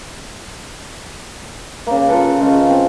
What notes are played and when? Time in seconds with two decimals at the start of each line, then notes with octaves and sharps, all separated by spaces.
1.87 C#3 A#3
2.09 F4 A4 B4
2.41 C#3 G#3 C#4
2.69 C4